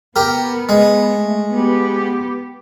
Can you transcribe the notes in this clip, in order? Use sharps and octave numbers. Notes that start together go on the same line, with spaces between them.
B3 G4 A#4
G#3
A3
B3 G4